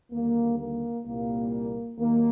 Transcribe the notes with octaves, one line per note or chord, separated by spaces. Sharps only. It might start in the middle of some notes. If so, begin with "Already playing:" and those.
D#2 D3 G3 A#3
A#3
C2 A#2 G3 A#3
D#2 D#3 F#3 A#3